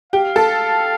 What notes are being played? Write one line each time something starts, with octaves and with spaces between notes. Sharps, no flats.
G4 F5
A4